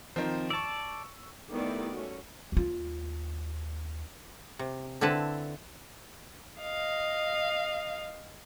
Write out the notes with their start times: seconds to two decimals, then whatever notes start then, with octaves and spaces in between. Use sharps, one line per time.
0.16 D#3 F3 C4
0.50 D5 A5 C#6 E6
1.51 D#3 G3 A3 B3 E4 D5
1.92 A3 C#4 F#4
2.52 D#2 F4
4.59 C3
5.01 D3 C4 E4 B4 A5
6.61 D#5 F5